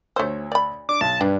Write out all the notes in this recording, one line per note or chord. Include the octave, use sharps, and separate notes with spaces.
D2 A3 A4 C5 C#5 E6
D5 B5
D4 D6
B1 A5
G2 D4 B4